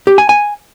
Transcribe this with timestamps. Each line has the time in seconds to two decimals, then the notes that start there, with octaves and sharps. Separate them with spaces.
0.07 G4
0.18 G#5
0.29 G#5